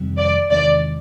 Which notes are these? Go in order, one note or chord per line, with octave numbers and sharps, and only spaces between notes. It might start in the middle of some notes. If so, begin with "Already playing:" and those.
Already playing: F2 C3 D#3 G3
D5
E2 C3 D#3 G#3 D5